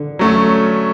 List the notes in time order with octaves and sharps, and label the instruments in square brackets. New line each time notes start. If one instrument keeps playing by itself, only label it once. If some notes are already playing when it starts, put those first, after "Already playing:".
Already playing: [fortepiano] D3
[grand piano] F#3 A3 C#4